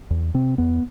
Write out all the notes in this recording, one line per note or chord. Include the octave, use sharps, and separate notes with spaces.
E2
C3 C4
E2 B3